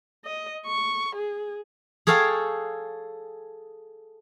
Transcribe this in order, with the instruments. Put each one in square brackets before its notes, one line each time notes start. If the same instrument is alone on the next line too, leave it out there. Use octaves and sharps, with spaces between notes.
[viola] D#5
C#6
G#4
[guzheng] G#4 A4 C#5 F5 G5 A5